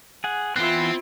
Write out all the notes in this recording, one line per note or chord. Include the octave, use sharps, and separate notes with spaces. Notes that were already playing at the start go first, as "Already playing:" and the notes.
G#4 F#5
E3 B3 C4 E4 F4 F#6